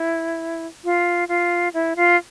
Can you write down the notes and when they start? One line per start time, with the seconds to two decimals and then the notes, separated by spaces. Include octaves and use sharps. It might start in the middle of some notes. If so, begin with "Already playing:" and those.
Already playing: E4
0.84 F4
1.28 F4
1.74 E4
1.96 F4